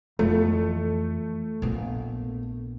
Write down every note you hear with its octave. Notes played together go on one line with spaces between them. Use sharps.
F2 E3 A3
A#1 B3